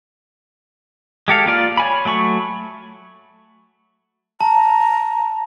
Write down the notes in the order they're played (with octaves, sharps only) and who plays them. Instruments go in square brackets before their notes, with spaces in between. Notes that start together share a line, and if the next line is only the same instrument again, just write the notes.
[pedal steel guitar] G#3 G4 A4 F5
A#3 F4 D5 F6
C#5 G#5 B5
F#3 A3 B5 C#6
[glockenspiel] A5 [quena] A#5